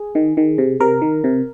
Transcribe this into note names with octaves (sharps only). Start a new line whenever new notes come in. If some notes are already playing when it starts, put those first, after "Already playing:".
Already playing: G#4
D#3
D#3
C3
C3 A#4
D#3
C3